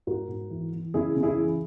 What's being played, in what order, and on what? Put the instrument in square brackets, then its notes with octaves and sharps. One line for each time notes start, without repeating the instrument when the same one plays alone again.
[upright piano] G#2 F#4 A#4
G#2
E3
E3
C#3 E4 G#4
C#3
E4 G#4
E3